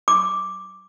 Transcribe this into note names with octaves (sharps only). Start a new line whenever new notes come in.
D6